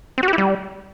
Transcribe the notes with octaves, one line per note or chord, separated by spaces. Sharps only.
C4
F#4
G4
E4
G3